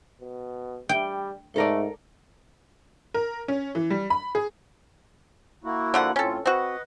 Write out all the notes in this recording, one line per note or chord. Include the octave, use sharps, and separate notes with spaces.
B2
G3 G5
G#2 A3 A4 A#4 D5
A#4
C#4
E3
G3
B5
G#4
A#3 E4 F#4
D3 F3 F#5
A2 C4 C#4 F4 A4
C4 F#4 B4 D#5 F#5